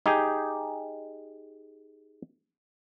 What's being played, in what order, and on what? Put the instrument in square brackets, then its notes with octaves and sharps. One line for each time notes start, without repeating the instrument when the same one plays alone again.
[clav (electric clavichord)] D#4 G4 G#4